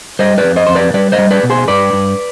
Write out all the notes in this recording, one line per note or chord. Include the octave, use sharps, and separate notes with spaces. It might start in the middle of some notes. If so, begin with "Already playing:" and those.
G3 C5 D#5
B4 D5
F2
C5 D#5
F2 C5
B4 D5
G3 B4 D5
C5 D#5
G3
B4 D5
B2
G#4 C5
G2 B4 D5
G2